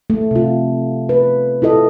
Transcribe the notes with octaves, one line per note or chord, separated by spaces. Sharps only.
A3
C3 F4
B4
E4 F4 A4 D#5